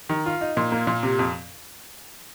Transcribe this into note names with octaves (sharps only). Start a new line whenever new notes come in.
D#3
F4
D#4
A#2
A#3
A#2
C3
F2